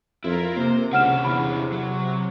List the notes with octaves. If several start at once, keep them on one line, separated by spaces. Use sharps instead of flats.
F2 E4 F4 A#4
C3 A#3 C5
C#2 D3 C#4 F#5 F6 E7
E2 B5
F#3